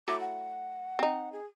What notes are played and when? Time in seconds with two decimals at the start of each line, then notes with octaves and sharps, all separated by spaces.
0.08 F#3 A3 E4 D6
0.20 F#5
0.99 C4 D#4
1.32 G#4